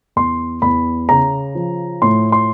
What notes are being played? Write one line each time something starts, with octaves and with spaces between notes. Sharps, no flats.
E2 C6
E2 B5
C#3 A#5
F3
A2 C6
C6